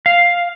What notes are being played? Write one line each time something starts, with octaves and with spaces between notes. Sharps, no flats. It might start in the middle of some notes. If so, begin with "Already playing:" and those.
F5